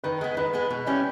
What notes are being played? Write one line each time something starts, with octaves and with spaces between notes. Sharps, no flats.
D#3 B4
G#3 B3
D#3 B4
G#3 B3
B2
G3 C#4 E4